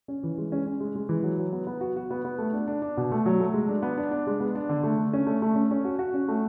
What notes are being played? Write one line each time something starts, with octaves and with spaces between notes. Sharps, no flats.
C#4
E3
G#3
C#4
C#4
G#3
G#3
E3
F#3
F#3
B3
B3
F#4
F#4
B3
B3
A3
D4
D4
D4
B2
A3
F#3
A3
G#3
D4
B3
D4
D4
G#3
B3
D4
D3
A3
D3
C#4
A3
A3
C#4
C#4
F#4
F#4
C#4
A3